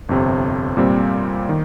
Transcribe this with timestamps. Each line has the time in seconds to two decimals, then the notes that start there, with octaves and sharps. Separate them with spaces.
0.09 G1 F2 C3
0.77 A#2 G3 C4
1.49 D#3